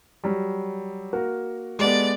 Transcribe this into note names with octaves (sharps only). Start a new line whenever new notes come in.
F#3 G3
A#3 F#4 A#4
G#3 B3 G4 A4 D5